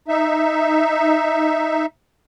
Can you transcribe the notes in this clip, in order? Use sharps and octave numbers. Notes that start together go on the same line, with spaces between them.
D#4 E5